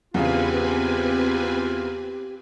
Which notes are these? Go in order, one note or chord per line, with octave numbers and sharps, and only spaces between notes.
E2 C#3 C4 F4 G4 B4 F5 G#5